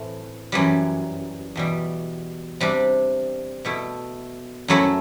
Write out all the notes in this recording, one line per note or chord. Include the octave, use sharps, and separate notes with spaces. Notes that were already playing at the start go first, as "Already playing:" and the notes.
Already playing: A2 E3 A3 C4
F#2 E3 G3
E2 B2 G3
C3 G3 D4
B2 A3 E4
F#2 F#3 A3 E4